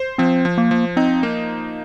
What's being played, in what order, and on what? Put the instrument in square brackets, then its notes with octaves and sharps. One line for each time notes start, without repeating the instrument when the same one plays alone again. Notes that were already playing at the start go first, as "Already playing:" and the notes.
Already playing: [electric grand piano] C5
[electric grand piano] F3 [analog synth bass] C4
[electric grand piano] F3
[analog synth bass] A#3
[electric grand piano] F3
[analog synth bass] C4 [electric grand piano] D#4
[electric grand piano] A#3